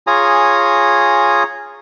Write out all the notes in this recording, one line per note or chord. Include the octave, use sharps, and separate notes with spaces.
F4 G#4 C#5 G#5 A#5 D#6